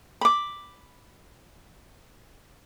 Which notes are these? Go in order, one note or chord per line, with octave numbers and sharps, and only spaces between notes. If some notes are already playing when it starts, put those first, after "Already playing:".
B5 D6